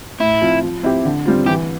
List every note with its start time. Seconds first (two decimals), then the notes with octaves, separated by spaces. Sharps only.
0.20 A2 E4
0.42 F3 C4 F4
0.63 F3
0.83 C4 E4 G4
1.05 D3
1.25 G3 C4 F4
1.46 E3 G4